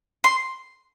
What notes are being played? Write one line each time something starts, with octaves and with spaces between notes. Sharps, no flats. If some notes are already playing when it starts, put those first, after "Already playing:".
C6